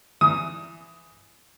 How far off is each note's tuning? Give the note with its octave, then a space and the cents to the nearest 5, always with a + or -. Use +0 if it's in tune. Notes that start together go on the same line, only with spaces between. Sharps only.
E3 +15 G#5 +10 D#6 +10